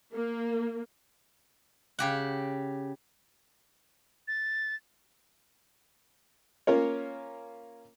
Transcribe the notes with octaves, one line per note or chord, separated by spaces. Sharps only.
A#3
C#3 G4 F#5
A6
A#3 C#4 F4 A#4 C#5